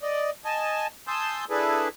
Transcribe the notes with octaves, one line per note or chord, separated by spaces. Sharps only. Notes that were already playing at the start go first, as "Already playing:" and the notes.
D5 D#5
D#5 G#5 A5
G#5 A5 C6 D#6 E6 G6
D4 E4 G#4 A4 B4